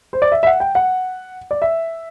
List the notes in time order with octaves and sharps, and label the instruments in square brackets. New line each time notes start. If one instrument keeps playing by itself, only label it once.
[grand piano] C5
D5
E5
E5
F#5
G5
F#5
D5
E5